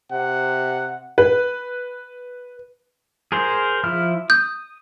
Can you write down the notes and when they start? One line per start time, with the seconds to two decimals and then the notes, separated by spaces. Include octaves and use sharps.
0.12 C3 F#5
1.18 B4
3.32 G#4 A#4 C5
3.84 F3 E4 F6
4.30 D#6 G6